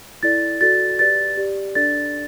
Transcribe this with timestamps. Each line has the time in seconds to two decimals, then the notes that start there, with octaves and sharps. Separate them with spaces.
0.23 E4 A4 D5 A6
0.61 F#4 A4 D5 A6
0.99 G4 B4 D5 A6
1.37 G4 D5
1.75 D4 A4 D5 A6